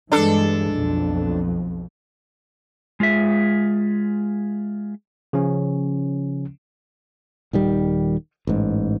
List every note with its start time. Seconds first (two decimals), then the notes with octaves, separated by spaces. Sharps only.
0.12 G2 E3 G#3 D4 A4
0.72 B1 F2
3.00 G#3 F4 G#4 E5
5.33 C#3 F3 C#4
7.53 D#1 D#3 G3
8.47 A1 G#2